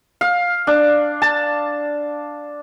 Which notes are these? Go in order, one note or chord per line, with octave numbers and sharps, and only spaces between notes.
F5
D4
A5